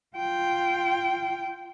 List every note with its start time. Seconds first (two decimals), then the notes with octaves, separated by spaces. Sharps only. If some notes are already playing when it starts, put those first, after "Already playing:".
0.17 F4 G5